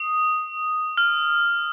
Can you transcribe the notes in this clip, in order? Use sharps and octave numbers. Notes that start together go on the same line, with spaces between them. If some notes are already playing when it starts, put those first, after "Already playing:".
Already playing: D#6
F6